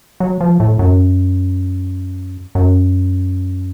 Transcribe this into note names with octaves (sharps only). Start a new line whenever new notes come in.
F#3
F3
A2
F#2
F#2